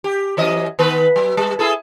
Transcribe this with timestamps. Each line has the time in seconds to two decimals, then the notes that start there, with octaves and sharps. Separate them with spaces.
0.04 G4
0.37 F#2 E3 D#5
0.79 D#3 B3 B4
1.16 F#3
1.37 G3
1.59 E4 G#4 A4